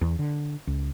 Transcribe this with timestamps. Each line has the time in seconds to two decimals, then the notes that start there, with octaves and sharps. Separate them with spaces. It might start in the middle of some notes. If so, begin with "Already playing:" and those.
0.01 E2
0.19 D3
0.67 C#2